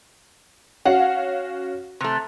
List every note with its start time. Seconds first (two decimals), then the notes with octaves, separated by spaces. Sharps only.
0.85 C#4 F#4 F5 F#5
2.00 C3 A3